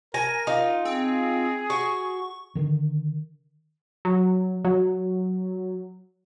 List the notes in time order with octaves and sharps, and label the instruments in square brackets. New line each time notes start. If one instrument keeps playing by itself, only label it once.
[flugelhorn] A#4 [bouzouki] G#5 [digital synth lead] A#6
[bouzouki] D#4 F4
[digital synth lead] C4 [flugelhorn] G#4
[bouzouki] F#4 [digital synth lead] C#6
[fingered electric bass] D3 D#3
[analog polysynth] F#3
F#3